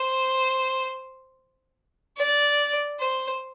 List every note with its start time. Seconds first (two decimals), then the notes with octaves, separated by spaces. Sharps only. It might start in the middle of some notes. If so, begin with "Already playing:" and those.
Already playing: C5
2.16 D5
2.99 C5